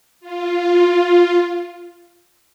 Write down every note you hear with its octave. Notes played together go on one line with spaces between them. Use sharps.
F4